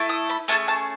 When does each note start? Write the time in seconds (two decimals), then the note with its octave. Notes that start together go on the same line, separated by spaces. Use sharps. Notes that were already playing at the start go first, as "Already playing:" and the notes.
Already playing: A3 E4 A4
0.09 D#6
0.29 B5
0.48 A3 C#4 G#4 A5
0.68 A5